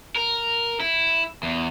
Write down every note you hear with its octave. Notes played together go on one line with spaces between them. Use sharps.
A#4
E4
E2